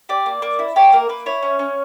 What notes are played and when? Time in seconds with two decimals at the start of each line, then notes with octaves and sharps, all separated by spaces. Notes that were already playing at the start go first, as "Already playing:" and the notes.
0.09 G4 D5
0.26 A#3
0.42 A#3
0.59 E4
0.76 G4 C#5
0.92 A#3 A#4
1.09 A#3 B4
1.26 E4 C#5
1.43 C#4
1.59 C#4